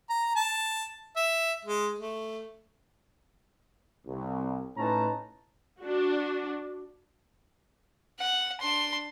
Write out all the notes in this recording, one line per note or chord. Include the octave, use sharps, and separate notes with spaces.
A#5
A5
E5
G#3
A3
C2
A2 C#4 D#4 B4 A5 A#5
D4 F#4
F#5
D4 C6